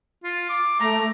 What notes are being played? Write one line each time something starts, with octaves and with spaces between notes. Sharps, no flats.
F4
D6
A3 A#5